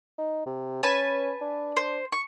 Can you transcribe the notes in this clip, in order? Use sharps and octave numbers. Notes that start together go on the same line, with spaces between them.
D#4
C3
C#4 B4 G#5 A5
D4
C5
C#6